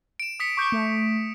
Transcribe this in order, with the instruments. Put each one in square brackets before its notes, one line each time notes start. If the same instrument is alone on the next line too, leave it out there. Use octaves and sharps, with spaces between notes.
[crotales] D7 E7
D#6 B6 C#7
[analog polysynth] C#6 D6 G6
A3